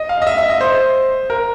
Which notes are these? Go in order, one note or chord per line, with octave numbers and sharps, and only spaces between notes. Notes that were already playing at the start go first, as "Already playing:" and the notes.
Already playing: D#5
F5
D#5
E5
E5
D#5
C5
A#4